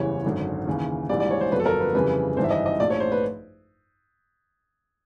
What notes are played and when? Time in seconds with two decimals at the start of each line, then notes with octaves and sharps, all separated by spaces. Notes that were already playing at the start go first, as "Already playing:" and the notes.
Already playing: F#1 E2 C#3 E3 G3 C#5
0.25 G#1 F#2 D3
0.67 D#2 C#3 E3
1.09 A#1 G#2 E3 G3 D5
1.20 D5
1.31 C#5
1.41 C5
1.52 G1 F2 D3 F#3 B4
1.60 A4
1.66 A#4
1.81 B4
1.94 F2 C#3 E3 G3 B4
2.37 G#1 G2 E3 G3 C5
2.44 E5
2.50 D#5
2.66 D#5
2.79 A#1 A2 F3 D5
2.90 C#5
3.00 C5
3.12 B4